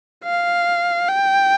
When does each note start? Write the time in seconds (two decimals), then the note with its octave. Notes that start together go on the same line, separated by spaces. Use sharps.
0.24 F5
1.08 G5